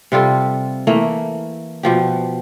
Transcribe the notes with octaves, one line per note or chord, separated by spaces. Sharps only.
C3 G3 F4 A4
E3 A3 A#3
B2 F3 G4